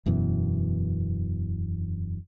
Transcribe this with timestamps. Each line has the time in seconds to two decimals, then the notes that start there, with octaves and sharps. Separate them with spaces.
0.06 E1 F#2 B2 E3